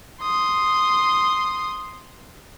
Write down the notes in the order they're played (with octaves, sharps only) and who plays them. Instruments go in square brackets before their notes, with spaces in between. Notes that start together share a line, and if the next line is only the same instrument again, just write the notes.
[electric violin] C6 D#6